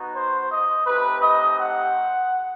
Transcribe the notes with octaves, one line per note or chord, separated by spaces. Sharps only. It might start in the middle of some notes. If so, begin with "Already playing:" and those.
Already playing: B3 D#4 F#4
C5
D#5
A3 C4 D#4 G4 B4
D#5
F#5